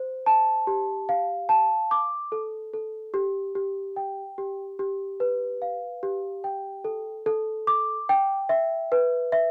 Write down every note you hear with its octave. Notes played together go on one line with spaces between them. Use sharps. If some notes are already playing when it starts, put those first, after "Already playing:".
Already playing: C5
A5
G4
F5
A5
D6
A4
A4
G4
G4
G5
G4
G4
B4
F5
G4
G5
A4
A4
D6
G5
E5
B4
E5